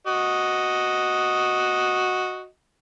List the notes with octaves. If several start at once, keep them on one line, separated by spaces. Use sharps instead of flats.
F#4 D#5